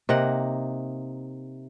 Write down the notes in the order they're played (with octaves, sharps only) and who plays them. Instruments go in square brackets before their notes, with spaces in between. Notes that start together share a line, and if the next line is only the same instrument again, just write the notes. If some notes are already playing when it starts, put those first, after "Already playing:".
[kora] C3 A#3 D#4 F#5